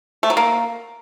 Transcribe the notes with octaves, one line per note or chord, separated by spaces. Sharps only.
A3
F#3
A#3